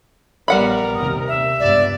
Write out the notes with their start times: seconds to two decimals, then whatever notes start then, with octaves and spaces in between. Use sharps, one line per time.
0.48 A#1 G3 B3 A#4 F#5 B5
0.95 D#2 C3 D#6
1.28 E5
1.60 C#2 G2 B3 D5